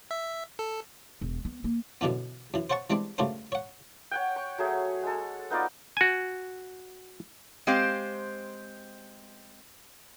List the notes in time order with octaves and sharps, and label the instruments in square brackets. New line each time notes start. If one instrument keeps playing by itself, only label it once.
[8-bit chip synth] E5
A4
[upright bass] E1
B3
A#3
[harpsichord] F#2 B2 D3 E3 B3
F#2 E3
C5 C#5 F#5 A5 C#6
E3 G3 G#3 C4 D4
G2 C#3 A3 F#4 A#4 C5
C#5 F#5
[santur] C#5 F#5 G5
C#6
F#3 A3 G#4
G#3 A4
B3 D#4 F4 D5
[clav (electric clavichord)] F#4 G#5
[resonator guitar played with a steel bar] G#3 C4 G4 C5 F5